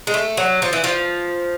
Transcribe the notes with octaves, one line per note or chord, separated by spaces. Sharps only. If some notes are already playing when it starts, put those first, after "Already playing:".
G#3
A3
F#3
F3
E3
F3